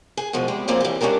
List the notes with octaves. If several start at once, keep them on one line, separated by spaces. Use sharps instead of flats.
G#4
B2 F3 G#3
C3 G3 G#3
F3 A#3 C4 C#4 G#4 D5
E3 G3
G#3 C#4 D4 G4 A#4